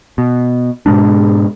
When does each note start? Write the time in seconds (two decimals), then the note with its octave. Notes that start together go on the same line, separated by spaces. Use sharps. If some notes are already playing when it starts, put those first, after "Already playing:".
0.18 B2
0.86 G#2 B2 G#3 D4